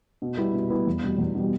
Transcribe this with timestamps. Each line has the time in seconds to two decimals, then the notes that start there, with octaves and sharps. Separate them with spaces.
0.22 B2
0.37 G3 B3 E4
0.54 B2
0.70 G3 B3 E4
0.87 E2
1.03 B2 G3
1.18 E2
1.35 B2 G3